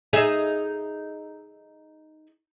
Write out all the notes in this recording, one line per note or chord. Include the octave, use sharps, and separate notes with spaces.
D#4 G#4 E5